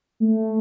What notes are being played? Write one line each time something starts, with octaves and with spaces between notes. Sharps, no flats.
A3